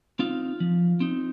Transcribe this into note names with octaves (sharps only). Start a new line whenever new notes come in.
C4 D#4 F4 F5
F3
C4 D#4